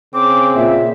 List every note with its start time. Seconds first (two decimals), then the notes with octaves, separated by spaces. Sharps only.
0.14 C#3 C4 D6
0.56 A#2 E5